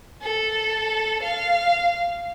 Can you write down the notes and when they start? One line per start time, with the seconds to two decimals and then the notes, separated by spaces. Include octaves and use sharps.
0.22 A4
1.23 F5